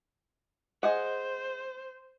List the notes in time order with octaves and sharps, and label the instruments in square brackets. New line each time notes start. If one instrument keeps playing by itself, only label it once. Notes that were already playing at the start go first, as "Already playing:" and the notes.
[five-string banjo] G#4 D#5 F#5 [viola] C5